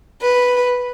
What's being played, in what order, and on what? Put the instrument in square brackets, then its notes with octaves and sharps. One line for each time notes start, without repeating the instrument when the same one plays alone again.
[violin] B4